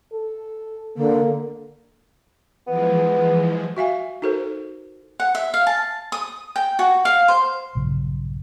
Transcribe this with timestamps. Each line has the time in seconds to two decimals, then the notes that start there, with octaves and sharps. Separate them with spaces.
0.12 A4
0.97 D3 A#3
2.67 E3 F3 G#3 B3
3.77 F#4 E5 F5 G#5
4.22 D#4 F#4 A4 A#4 C5
5.20 F#5
5.35 E5
5.54 F5
5.67 A5
6.12 D#6
6.56 G5
6.79 F#4
7.05 F5
7.28 C5
7.75 A#1 G2 C#3 F#3